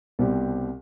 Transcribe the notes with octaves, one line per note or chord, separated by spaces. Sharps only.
C2 B2 G3 C4 G4